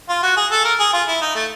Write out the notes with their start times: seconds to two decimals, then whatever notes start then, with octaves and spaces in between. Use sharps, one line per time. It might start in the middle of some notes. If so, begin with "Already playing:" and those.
0.09 F4
0.23 F#4
0.37 G#4
0.51 A4
0.65 A#4
0.79 G#4
0.93 F4
1.08 E4
1.21 D#4
1.35 A3